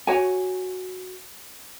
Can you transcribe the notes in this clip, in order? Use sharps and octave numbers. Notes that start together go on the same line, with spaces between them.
F#4 C#5 G#5